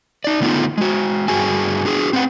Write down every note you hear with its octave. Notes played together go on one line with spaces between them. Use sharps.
D#4 D5
D3 A3 B3 D#4 F4
G#3 F#4
G2 F#4 G#4 G#5
D4 F#4 G#4
C4 B4 F#5